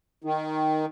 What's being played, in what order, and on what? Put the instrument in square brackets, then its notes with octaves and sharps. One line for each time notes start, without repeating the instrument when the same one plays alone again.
[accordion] D#3 [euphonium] D#4